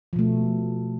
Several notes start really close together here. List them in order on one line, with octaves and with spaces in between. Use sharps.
F3 B2 A3